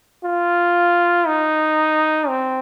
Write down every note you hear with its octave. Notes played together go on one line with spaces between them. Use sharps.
F4
D#4
C4